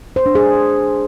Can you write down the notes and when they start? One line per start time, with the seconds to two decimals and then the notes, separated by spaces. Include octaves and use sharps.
0.16 C5
0.26 D4
0.35 G#4